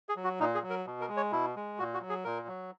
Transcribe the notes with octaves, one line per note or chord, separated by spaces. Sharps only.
G#4
F#3
F#4
A#2 D#4
G#4
F#3
A#4
B2
A#4
G#3
C#5
B2 E4
G#3
A#2 F#4
F#4
F#3
G#4
A#2 A#4
F#3